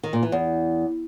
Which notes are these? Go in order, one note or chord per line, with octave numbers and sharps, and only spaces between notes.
D#3
A#2
E3
E2